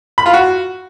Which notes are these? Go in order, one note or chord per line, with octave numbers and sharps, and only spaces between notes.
B5
F4
F#4